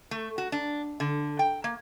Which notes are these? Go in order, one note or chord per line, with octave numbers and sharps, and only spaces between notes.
A3
F#4
D4
D3
G5
A#3